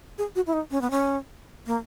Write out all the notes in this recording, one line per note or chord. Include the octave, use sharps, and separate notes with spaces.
G#4
F#4
E4
D#4
C#4
B3
C#4
A#3